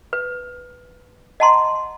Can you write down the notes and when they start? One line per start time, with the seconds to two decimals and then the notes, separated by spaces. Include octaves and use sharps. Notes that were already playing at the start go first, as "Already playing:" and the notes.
0.13 B4
1.40 D#5 F#5 A5 A#5 C6